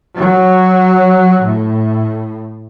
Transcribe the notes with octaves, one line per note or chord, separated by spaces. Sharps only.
F#3
A2